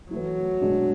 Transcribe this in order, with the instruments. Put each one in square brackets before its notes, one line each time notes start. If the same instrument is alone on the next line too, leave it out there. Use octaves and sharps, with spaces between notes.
[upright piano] E3 A3 E4 [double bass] F#3
[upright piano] B2 G#3 D4 F#4